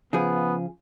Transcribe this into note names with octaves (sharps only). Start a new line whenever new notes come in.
C#3 F3 B3 G#4